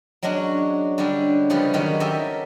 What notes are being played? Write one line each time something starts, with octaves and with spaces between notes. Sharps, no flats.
F#3 G#3 C#4 D4 F#4
D3 G3 G#3 C#4 D4
C#3 F3 G3 G#4 B4 C#5
D#3 F#3 G#3 C#4 G4 C#5
G4 A4 A#4 D#5 E5